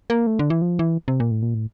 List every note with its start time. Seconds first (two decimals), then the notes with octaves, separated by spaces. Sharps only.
0.10 A#3
0.27 A3
0.39 D3
0.50 E3
0.62 F3
0.79 E3
1.08 C3
1.20 A#2
1.31 A2
1.42 A#2
1.54 A2